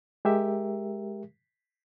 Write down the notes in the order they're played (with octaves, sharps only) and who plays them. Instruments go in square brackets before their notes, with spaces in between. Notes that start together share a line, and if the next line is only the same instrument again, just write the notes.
[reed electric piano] G#3 G4 A#4 E5